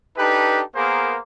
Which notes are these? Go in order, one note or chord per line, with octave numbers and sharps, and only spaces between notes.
D4 D#4 G4 A4 B4
A#3 B3 G#4 A#4 C5 D6